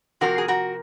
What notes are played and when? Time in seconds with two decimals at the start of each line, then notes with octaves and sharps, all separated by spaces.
0.21 C3 F3 A#3 F#4 A#4
0.38 G#4
0.48 F#4 A#4